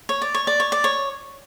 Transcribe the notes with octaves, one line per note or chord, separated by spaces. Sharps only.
C#5
D5
C#5
D5
C#5
D5
C#5